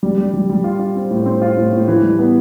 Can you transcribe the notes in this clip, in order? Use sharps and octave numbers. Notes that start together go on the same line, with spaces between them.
G3
G3
G3
G3
F4
F4
C4
A2
C4
F4
A2
A2
E3
G3
B3